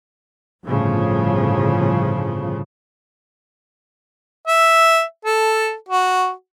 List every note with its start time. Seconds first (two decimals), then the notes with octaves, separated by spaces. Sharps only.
0.64 G1 A2 C#3 F3
4.48 E5
5.25 A4
5.89 F#4